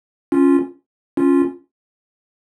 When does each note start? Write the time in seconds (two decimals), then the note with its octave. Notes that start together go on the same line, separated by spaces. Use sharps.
0.32 C#4 F4
1.17 C#4 F4